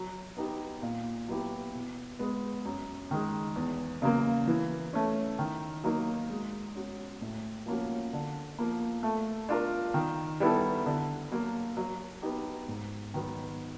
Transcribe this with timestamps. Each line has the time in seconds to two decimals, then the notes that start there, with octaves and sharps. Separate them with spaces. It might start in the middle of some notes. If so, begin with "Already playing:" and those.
Already playing: F#3
0.37 B3 D#4 G4
0.82 A#2
1.28 F#3 B3 E4 G4
1.74 B2
2.19 G#3 B3
2.65 F#2
3.11 D#3 G#3
3.56 E2
4.02 C#3 F#3 A#3
4.48 E3
4.93 A3 C#4
5.39 D#3
5.84 F#3 A#3 D#4
6.30 G#3
6.75 C#4 F#4
7.21 A2
7.66 F3 A#3 C#4 F#4
8.13 D3
8.58 F3 A#3
9.03 A3
9.49 D4 F4 A#4
9.94 D#3
10.40 G3 B3 E4 A4
10.86 D3
11.32 F#3 A#3
11.77 F#3
12.22 B3 D#4 G4
12.68 G#2
13.14 D#3 F#3 B3